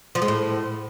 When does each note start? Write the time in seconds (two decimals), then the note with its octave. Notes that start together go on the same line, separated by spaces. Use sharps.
0.15 F3
0.22 G#3
0.28 A2